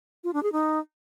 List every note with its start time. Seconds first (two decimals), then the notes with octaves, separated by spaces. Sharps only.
0.24 F4
0.33 D4
0.43 G#4
0.52 D#4